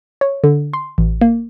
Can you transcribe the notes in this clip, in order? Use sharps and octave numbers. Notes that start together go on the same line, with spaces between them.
C#5
D3
C6
A1
A#3